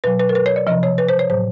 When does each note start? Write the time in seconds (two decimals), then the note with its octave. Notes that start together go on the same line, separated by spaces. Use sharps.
0.04 B2 F#3 B4
0.20 B4
0.29 A#4
0.35 B4
0.46 C#5
0.56 D5
0.67 C3 F3 D#5
0.83 C#5
0.98 B4
1.09 C5
1.19 C#5
1.30 A2 F#3 C5